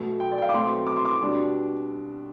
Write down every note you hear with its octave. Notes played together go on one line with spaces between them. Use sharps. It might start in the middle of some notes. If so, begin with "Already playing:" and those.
Already playing: B1 B2 A3
G5
D5
G5
F5
D6
B1 B2 A3 C4 C6
D6
C6
D6
B2 G3 D4